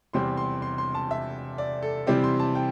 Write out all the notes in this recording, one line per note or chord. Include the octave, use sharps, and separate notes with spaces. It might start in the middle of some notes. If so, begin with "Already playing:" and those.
E2 C3 G3 C4 C6
C6
C6
C6
A5
E5
D5
A4
C3 E3 G3 C4 D5
C6
A5
G5